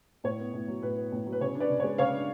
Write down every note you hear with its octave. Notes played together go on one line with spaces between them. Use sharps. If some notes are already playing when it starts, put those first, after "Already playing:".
A2 C#5
B3
A2
F#3
A2 B4
B3
A2
F#3
B4
C#3 C#5
D4
B4 D5
C#3
G#3 C#5
C#3 C#5 F5
D4